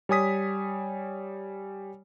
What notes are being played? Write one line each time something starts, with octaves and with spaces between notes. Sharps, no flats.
G3 C#5 G#5 D#6 B6